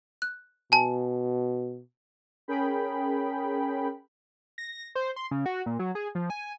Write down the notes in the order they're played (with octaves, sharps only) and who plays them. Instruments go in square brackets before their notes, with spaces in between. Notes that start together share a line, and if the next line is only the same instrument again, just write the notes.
[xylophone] F#6
[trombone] B2 [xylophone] G#5 A5
[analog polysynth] C#4 G#4 A#4 G5 B5
[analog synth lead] A#6
C5
C6
C#3
F#4
A#2
F#3
G#4
F3
G#5